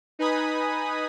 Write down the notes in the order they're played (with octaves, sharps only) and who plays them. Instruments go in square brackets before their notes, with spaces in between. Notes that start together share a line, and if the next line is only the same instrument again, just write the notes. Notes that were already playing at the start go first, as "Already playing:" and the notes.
[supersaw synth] D#4 B4 G#5 B5 D#6